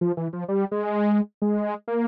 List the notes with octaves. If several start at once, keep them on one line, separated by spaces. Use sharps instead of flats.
F3
E3
F3
G3
G#3
G#3
A#3